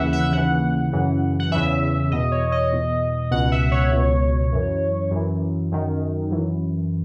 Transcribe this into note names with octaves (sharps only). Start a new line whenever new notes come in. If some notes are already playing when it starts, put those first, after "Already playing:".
Already playing: D#2 C#3 E3 E5 F#5
E5
D#2 C#3 E3 F#5
F#2 C#3 E3
F#5
E2 C#3 E3 E5
E2 B2 D#5
C#5
D#5
E2 B2
C#2 B2 F#5
E5
C#5
C#2 B2
F#2 E3
F#2 E3
F#2 D#3
F#2 E3